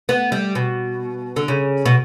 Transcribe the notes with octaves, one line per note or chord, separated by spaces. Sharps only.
B3
G3
B2
D3
C#3
B2